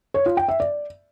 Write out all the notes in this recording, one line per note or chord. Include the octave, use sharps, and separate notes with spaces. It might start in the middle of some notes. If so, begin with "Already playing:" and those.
C#5
F4
G5
E5
D5